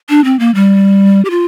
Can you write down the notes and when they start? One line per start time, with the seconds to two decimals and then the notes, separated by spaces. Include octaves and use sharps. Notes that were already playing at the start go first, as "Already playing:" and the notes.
0.09 D4
0.24 C4
0.40 A#3
0.55 G3
1.25 G4
1.30 F4